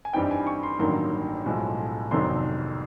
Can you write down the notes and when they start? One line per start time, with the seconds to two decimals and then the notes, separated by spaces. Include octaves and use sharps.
0.05 G#5
0.13 G2 E3 G3 C4 D#4 G5
0.31 G#5
0.47 C#6
0.63 C6
0.79 A1 G2 D#3 F#3 A#3 C6
1.46 B1 A2 F3 G#3
2.11 G1 F2 C3 D#3 F#3 C6